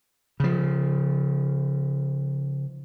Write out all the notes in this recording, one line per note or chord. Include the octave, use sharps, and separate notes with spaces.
C#3 F3